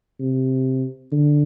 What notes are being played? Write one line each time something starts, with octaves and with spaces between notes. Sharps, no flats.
C3
D3